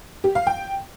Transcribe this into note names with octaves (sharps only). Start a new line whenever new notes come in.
G4
F5
G5